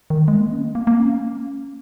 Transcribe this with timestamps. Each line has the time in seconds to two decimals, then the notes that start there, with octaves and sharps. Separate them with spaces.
0.10 D#3
0.28 G#3
0.40 A#3
0.52 C#4
0.63 A#3
0.75 A#3
0.87 A#3
0.99 C#4